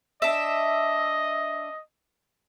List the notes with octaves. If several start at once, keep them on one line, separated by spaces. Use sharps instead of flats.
D4 D#5 E5